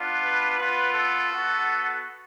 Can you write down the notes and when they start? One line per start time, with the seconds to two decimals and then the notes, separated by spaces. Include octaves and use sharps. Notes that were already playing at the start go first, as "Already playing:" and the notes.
Already playing: B3 D4 F4
0.22 B4
0.58 B3 F4 B4
0.93 A4
1.31 B3 F#4